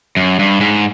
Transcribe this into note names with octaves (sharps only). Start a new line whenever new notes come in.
F#2
G2
G#2